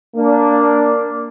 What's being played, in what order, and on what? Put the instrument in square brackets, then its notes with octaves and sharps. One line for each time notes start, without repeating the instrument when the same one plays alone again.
[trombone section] A#3 D4